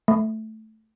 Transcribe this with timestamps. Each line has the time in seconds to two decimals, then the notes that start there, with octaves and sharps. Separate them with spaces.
0.08 A3